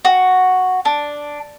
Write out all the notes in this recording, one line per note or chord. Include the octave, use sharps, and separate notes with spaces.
F#4
D4